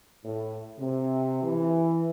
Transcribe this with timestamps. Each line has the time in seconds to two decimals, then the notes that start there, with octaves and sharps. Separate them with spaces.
0.24 A2
0.79 C3
1.43 E3